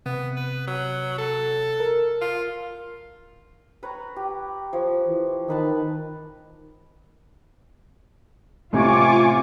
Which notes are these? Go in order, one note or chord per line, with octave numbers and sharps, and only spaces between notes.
C3 B3
B4
F#3
A4
A#4
F4
B4 C#5 A#5
G4
F3 C#5
E3
D#3 D#4 B4 A5
A1 C3 F4 G#5 C#6 D6